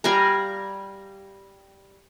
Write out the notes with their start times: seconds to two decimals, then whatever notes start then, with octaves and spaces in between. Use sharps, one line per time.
0.04 G3 F5 G#5 A#5